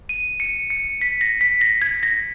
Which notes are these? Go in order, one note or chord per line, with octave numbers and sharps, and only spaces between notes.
D#7
C#7
C#7
B6
A#6
B6
A#6
G#6
A#6